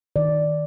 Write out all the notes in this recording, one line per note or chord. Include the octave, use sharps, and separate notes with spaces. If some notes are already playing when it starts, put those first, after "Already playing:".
D#3 D5